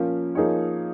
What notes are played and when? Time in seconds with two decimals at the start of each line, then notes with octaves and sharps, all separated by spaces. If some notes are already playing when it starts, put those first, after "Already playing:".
Already playing: F3 A#3 C#4
0.35 F3 A#3 D#4 G#4 C#5